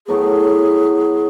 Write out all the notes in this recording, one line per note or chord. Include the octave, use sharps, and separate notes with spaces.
A2 F#3 B3 G#4